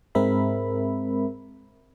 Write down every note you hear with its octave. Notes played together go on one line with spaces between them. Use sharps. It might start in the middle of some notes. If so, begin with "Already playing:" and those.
G#2 G#3 C4 A#4 E5 B5